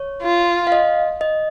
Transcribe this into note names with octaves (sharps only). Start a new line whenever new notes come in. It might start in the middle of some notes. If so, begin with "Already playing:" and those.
Already playing: C#5
F4
F5
D#5
D#5